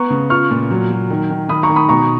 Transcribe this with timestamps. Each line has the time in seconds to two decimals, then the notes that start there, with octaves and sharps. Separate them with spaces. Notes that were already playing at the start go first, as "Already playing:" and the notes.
Already playing: B3 A#5 C#6
0.10 C#3
0.30 F4 C#6 F6
0.51 A#2
0.71 F#3
0.90 F#3
1.10 D#3
1.30 D#3
1.49 D#3 B5 D#6
1.63 A#5 C#6
1.70 D#3
1.76 B5 D#6
1.89 B2 A#5 C#6